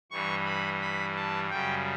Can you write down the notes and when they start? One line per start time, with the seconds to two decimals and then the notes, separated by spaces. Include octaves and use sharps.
0.11 G2 E3 G3 C#6
0.45 B5
0.81 B5
1.16 A5
1.50 F#2 C#3 G3 G5